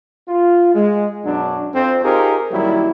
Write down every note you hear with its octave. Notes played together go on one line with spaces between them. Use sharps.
F4
G#3
F#2 B2 F#3 D4
F2 C4
D#4 F4 G4 G#4 A#4 C5
F#2 D#3 F#3 G3 A#3 E4